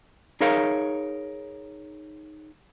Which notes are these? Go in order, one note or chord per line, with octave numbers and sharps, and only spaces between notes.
D#4 G#4 A#4 C#5 F5